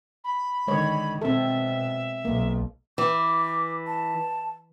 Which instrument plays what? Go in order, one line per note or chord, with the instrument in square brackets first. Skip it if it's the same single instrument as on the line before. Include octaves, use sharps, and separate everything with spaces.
[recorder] B5
[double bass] D3 D#3 [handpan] G#3 C#5
[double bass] B2 [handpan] C4 A4 [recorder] E5
[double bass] B1 [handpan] A#3
[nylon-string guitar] E3 [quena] D6
[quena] A5